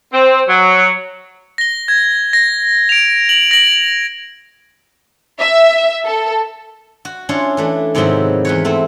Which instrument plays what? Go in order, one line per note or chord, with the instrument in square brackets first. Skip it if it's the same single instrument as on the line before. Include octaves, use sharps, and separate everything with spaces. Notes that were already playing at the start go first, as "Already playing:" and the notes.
[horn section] C4
F#3
[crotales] A#6 G7
G#6
A#6
D7 F7
F#7
A#6 F#7
[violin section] E5
A4
[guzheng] F#4
C#4 D4 E4 F4 C#5 F5
E3 A3 D4
G#2 C3 D#3 F3 F#3 E4
E2 B4 C#5
A3 C4 E4